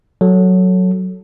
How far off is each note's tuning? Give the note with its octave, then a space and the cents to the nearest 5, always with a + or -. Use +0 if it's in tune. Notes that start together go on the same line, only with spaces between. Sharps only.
F#3 +0 A4 +0